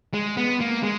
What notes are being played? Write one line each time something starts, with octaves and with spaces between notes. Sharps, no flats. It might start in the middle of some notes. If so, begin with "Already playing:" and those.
G#3
B3
A#3
G#3